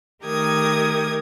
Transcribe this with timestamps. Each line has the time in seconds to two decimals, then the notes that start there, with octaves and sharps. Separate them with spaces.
0.23 D#3 A3 G4 A#4 D#6 G#6